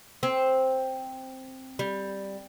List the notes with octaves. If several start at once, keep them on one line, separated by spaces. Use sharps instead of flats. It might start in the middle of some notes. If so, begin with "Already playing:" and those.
C4
G3